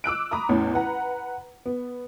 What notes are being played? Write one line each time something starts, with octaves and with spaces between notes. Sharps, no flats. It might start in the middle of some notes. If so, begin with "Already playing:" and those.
D6 E6 F#6 D7
A#5 B5 D6 D#6
A1 E2 C#4
B4 F#5 A#5
B3